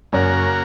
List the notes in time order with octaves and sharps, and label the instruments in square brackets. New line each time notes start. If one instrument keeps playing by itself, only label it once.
[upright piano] F#2 [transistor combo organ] C#3 A#3 F#4 A#4